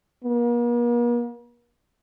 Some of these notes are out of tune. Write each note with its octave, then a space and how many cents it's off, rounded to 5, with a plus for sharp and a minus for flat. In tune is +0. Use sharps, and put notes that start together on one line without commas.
A#3 +45